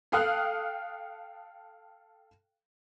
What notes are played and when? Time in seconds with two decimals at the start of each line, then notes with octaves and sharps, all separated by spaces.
0.12 A4 F5 G5 D#6 F6 F#6